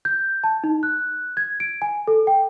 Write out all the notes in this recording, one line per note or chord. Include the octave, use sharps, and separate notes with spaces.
G6
A5
D#4
F#6
G#6
D7
G#5
A4
G5